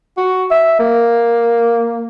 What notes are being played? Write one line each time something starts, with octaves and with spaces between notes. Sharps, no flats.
F#4
E5
A#3